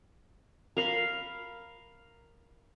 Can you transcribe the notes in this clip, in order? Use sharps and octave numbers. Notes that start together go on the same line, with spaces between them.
A#4 F5 B5